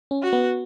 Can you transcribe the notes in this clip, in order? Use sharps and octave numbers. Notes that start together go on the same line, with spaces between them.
C#4
F#4
B3